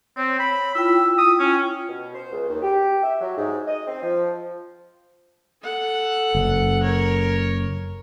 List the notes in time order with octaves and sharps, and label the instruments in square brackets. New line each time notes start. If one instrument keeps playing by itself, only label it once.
[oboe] C4 [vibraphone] C#5
[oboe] B5
[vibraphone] E4 F4 G5 [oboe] E6
[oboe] D#6
C#4
[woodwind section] B2
C5
C#2
D#2
G4
E5
F#3
G#2
D#5
C4
F3
[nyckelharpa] A4 F#5
[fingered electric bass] F#1
[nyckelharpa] A#4 C#5